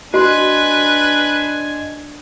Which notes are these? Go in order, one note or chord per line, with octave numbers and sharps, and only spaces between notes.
D4 F#4 B4 D#5 G#5 C6